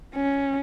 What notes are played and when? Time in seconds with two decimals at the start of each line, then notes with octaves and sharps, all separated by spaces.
0.15 C#4